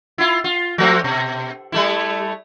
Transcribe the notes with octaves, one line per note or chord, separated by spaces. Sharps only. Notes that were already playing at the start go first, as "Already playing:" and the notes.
E4 F4
F4
F3 A3 C4
B2
G3 A3 E4